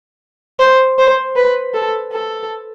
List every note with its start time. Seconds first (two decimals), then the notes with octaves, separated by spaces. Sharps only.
0.60 C5
0.98 C5
1.36 B4
1.74 A4
2.12 A4